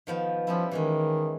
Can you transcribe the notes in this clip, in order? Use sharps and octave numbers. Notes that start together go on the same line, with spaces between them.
D#3 F3 B3
F3 G3 C#4 E4
D#3 E3 G#3 C#4